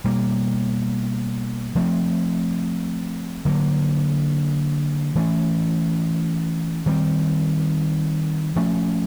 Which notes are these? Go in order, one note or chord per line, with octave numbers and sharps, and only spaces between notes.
B2 G3 A#3
F3 A3 C4
D3 F#3 A#3
E3 A3 C#4
D#3 G3 C4
F3 A3 C#4